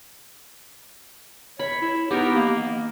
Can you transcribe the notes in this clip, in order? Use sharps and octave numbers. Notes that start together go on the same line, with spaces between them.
C#5 B5
E4
B3 D#4 G4 A#4
A#3